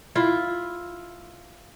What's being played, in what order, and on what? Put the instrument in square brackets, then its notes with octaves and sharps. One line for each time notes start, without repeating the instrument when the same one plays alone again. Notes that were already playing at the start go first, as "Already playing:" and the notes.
[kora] E4 F4